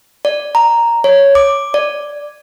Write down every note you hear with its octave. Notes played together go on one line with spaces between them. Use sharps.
D5
A#5
C#5
D6
D5